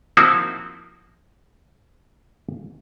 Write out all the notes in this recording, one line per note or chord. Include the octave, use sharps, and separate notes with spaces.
F3 A#3 C4 D#4 E4 F#4